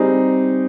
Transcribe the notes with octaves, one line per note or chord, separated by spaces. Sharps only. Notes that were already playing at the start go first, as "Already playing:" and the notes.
Already playing: G3 C4 D#4 G#4